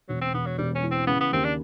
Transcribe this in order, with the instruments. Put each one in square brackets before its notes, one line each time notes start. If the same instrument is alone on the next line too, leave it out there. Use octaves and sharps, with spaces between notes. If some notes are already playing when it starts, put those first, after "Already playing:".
[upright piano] E1 [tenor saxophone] F#3
[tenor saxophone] C4
[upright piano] E1 [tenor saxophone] B3
[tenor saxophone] F#3
[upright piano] E1 [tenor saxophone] G3
[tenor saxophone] C#4
[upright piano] E3
[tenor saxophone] C4
[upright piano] C#3 [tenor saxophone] B3
[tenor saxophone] B3
[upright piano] D#2 [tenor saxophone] C4
[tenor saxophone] D4